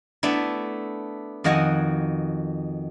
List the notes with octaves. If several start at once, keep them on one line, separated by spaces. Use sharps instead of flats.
A3 B3 D4 E4
F2 D#3 F#4 D#5 F#5 G#5